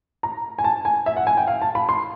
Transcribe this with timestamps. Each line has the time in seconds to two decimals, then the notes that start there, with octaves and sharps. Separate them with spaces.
0.23 A#5
0.58 G#5
0.64 A5
0.85 G#5
1.06 E5
1.17 F#5
1.27 G#5
1.37 G5
1.47 F5
1.62 A5
1.75 B5
1.89 C6